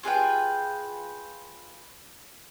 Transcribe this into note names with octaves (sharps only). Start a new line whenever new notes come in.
F4 G#4 B4 G5